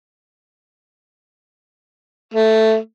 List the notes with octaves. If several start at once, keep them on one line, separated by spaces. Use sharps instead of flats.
A3